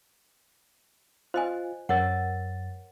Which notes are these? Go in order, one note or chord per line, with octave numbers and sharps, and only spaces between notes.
F4 C5 D#5 G#5
F#2 A#4 C#5 F#5 A6